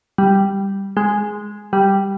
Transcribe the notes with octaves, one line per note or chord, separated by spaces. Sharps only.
G3
G#3
G3